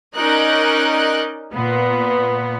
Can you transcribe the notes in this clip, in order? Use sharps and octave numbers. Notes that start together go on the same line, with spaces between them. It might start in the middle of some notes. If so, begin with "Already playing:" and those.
C#4 D#4 A#4 D5 D#5 F#6
A#2 B3